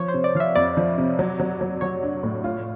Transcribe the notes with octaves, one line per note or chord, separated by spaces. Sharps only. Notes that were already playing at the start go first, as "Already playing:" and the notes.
Already playing: F3 C#5
C5
C3
D5
F3 F5
E5
F2 D5
F3
C3
F#3
F#3
F#3
F#3 C#5
D4
A2
F4